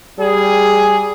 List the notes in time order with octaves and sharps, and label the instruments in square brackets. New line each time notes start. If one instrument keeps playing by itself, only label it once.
[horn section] G3 G#4